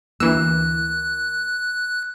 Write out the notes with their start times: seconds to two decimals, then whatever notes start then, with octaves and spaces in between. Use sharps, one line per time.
0.20 D2 E3 A#3 E6 F#6